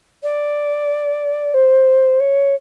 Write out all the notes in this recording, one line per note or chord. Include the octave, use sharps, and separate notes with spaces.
D5
C5
C#5